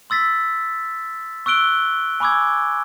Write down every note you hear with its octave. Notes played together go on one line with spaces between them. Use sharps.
C6 E6 A6 B6
C#6 E6 F#6 D7 G7
G#5 B5 C#6 D6 E6 G#6